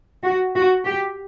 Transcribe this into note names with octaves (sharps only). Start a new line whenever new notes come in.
F#4
F#4
G4